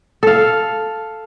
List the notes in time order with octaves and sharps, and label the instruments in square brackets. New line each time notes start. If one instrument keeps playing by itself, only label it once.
[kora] A4 F5